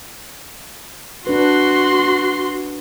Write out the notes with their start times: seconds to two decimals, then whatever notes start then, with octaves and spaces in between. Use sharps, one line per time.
1.27 D4 F#4 B4 C6